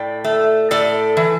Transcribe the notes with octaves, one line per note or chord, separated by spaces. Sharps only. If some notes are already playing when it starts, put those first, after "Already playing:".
Already playing: A2 D5 G5
A3
A2 A4 D5
E3